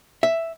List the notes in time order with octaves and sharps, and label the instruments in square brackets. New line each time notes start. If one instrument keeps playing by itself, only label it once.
[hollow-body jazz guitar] E5